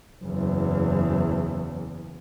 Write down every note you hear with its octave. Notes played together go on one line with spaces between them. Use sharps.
F#1 E2